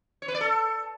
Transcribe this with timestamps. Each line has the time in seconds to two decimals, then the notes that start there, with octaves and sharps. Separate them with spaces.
0.22 C#5
0.28 B4
0.34 D5
0.41 A4